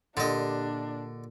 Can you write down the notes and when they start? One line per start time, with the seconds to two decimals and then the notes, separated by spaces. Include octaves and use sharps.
0.17 A#2 D3 D4 G4 D#5